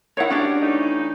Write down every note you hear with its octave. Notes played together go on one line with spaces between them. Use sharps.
G#2 D#3 E4 C#5 F#5
C#4 D4 F#4 G4 D5
E3 A3 D#4